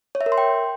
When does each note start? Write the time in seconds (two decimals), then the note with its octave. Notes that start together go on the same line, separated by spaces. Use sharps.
0.15 C#5
0.21 E5
0.26 A#4
0.32 C6
0.38 G5